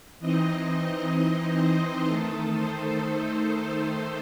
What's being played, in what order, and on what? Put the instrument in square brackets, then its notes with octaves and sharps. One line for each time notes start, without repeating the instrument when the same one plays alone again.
[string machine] E3 C4 D#4 D#5
C5
D#3 A3 D#4 A4
C5